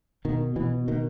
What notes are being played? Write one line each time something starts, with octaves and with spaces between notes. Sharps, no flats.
B2 D#3
B2 E3
B2 D#3